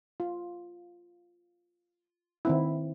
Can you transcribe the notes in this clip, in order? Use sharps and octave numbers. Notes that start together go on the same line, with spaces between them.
F4
D#3 C4 E4